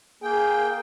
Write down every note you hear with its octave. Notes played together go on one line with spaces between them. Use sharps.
A#3 G#4 G5